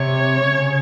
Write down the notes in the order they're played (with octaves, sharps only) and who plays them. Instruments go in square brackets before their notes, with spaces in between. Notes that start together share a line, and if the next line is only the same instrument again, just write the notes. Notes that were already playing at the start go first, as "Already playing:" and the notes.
Already playing: [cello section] C3 [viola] C#5
[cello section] C#3